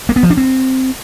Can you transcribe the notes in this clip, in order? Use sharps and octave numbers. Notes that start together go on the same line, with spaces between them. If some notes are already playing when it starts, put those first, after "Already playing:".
A#3
B3
F3
D4
C4